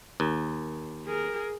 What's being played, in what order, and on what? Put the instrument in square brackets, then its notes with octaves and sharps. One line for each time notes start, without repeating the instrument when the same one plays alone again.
[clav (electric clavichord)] D#2
[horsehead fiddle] G#4 A#4